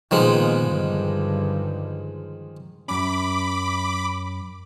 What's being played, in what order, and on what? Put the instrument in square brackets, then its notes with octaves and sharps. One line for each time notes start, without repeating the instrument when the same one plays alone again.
[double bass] A#2 B3 [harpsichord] D#3 F3 G#3
[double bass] G2 D3
[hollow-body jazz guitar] F#2 C#4 [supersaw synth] B5 D6